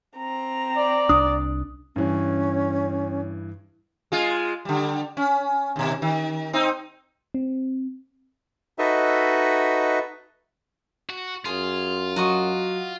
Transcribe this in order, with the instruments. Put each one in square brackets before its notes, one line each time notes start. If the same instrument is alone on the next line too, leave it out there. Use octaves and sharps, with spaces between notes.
[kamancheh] C4 A#5
[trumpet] D5
[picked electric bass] C2 D4 [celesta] D#6
[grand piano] G2 E3 [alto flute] C#4
[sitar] G#3 F4
D3 G3
C#4
D#2 B2
D#3
C4 D#4
[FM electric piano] C4
[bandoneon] D#4 F#4 A4 B4 D#5 E5
[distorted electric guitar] F#4
[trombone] F#2 [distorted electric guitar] F4 [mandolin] G#4
[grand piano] F#3 [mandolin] F#4 D#5 C#6